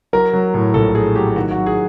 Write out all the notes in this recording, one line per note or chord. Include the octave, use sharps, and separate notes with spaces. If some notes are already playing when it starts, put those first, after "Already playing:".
F#3 A#4
F#3
A2
A#1 A4
A3 G#4
F#3 G4
D#3 F#4
F#4
F#3
G#4